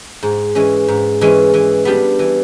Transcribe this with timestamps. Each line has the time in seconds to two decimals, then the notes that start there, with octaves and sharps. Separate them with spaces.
0.23 G#2
0.55 E3 G#3 C#4
0.88 G#2
1.21 E3 G#3 C#4
1.54 E3
1.85 G3 B3 D4 G4
2.19 E3